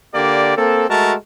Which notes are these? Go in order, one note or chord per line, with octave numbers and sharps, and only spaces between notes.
D3 A#3 G4 D5
A#3 C4 A4
G#3 A3 F#4 A#4 A5